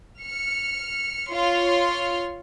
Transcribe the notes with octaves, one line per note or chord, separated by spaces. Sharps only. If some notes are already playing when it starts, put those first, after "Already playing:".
F6 C#7
F4 C#5 C6 F6